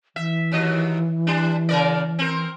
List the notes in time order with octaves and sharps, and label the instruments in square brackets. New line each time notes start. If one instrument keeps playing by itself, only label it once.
[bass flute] E3 [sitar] E5
[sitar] D#2 F#3 D#5
G3 D4
C#3 A#4 D5
C4 A#4